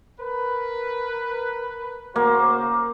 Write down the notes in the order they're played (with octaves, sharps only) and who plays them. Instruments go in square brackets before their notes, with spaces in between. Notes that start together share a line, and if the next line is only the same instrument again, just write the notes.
[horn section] A#4 B4
[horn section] C#3 F#4 C5 [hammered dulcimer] A#3